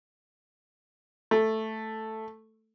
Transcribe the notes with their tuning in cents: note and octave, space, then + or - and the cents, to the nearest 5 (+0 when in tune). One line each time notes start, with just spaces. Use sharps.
A3 +0